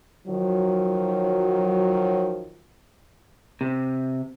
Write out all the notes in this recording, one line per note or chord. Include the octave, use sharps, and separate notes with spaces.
D#3 F3 F#3
C3